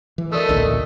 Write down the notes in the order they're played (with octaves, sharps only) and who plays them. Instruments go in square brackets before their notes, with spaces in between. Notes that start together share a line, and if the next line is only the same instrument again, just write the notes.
[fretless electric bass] E3
[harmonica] A3 D#5 [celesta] A#4 D5 E6
[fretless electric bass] A1 D2 A#2